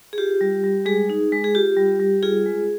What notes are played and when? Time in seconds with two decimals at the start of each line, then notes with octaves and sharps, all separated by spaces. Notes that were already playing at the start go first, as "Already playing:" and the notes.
0.13 G#4
0.18 F4 G4
0.41 G3
0.64 G3
0.86 G#3 G#4
1.10 D#4
1.32 G#3
1.44 G#4
1.54 F4 G4
1.77 G3
2.00 G3
2.23 F4 G#4
2.46 G#3